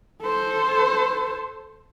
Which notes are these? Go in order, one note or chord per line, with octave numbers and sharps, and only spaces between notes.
A4 C5